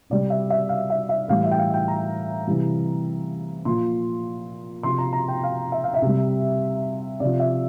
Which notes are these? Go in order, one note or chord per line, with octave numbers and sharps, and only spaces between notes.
C3 G3 D5
E5
E5
F5
E5
E5
A2 E3 G3 F5
E5
G5
F5
G5
A#5
C3 E3 G3
A#2 F3 C6
C3 F3 C6
A#5
A#5
G5
F5
E5
F5
E5
C3 G3
C3 F3 D5
E5